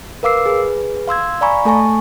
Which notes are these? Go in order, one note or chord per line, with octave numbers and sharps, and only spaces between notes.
A#4 B4 F5 D6 E6 C7
G#4 B4
F5 C6 E6 G#6
D5 F5 G#5 A#5 B5 C#6
A3 A4 G#5 A5 C#6